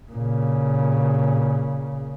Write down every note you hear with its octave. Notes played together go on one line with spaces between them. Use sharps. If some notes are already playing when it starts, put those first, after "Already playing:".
A#2 C#3